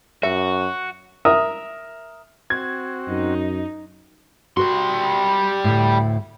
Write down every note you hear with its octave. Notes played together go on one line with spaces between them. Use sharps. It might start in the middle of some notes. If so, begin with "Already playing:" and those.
F#2 F#4 E5
A#4 E5 D#6
C4 F#4 G#6
F#2 D#4
G3 F#4 A#4 C6
D2 A2